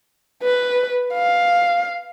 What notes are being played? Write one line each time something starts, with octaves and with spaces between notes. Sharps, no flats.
B4
F5